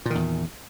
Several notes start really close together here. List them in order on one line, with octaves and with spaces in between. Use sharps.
A#2 D#3 E2